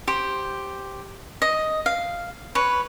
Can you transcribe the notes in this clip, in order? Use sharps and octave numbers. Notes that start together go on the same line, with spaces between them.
G4 C5
D#5
F5
B4 C#5